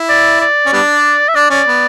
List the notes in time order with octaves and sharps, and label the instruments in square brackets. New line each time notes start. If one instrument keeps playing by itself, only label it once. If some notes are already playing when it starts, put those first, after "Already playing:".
Already playing: [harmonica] E4
[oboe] D5
D5
[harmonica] C#4
G3 B3 D4
[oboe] E5
[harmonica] D4 [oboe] D5
[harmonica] C#4 [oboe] D5
[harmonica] B3